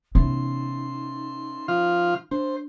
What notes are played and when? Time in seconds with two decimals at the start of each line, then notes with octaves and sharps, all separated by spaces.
0.15 C3 E3 B3 C#4 D#4 C6
1.68 F3 F4 F6
2.31 D4 C5